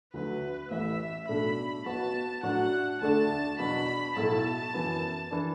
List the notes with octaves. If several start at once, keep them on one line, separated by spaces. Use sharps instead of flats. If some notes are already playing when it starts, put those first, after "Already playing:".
D2 D3 F#3 B4
A1 A2 E3 E5
B1 A2 A3 D4 B5
B1 B2 B3 F#4 A5
A2 F#3 D4 F#4 F#5
D2 D3 A3 D4 A5
E2 B2 F#3 D4 B5
B1 A2 F#3 A3 E4 A5
F#2 E3 B3 E4
E3 D4